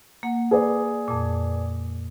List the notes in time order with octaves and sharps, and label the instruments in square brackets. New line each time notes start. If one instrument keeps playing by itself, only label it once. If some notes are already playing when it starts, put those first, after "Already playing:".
[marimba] A#3 F#5
[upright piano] G#4 B4 D5
[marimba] F2 A#2